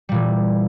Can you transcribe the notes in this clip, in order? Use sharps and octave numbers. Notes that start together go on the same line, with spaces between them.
A#2 E3 G3